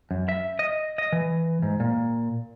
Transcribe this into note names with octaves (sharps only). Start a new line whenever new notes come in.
F#2
E5
D#5
D#5
E3
G#2
A#2